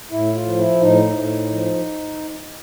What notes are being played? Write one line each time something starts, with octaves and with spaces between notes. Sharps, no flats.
A2 E4
F4
F3
E4
A2 D#4
A2
F3